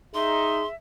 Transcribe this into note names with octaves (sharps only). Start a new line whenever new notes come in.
D#4 G#4 E5 C6